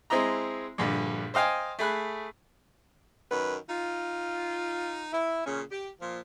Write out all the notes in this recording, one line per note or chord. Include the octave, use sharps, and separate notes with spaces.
G#3 C4 E4 D#5 A#5
A#1 G2 D3
C5 D#5 F5 G5 G#5
A3 G#4 B5 F#6
F#2 D#3 B4
D#4 F4
E4
A#2 C#3 C#4
G4
A#2 F3